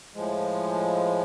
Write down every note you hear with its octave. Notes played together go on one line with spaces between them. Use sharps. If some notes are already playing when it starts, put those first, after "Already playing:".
A2 F3 G#3